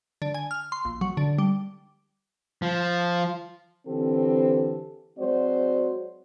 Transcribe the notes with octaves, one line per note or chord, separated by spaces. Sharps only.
D3
G#5
F6
C6
A#1
F#3
D3
G3
F3
D3 E3 C4 G4 A4
F#3 G#3 C4 F#4 C5 D5